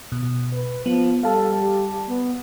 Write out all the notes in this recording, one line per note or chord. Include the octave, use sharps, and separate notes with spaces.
B2
B4
F3 B3
G3 A4 F5 A5
G4
B3